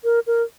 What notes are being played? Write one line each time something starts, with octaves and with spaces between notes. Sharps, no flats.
A#4
A#4